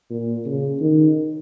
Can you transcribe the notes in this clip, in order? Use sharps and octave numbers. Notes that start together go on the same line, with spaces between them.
A#2
C#3
D#3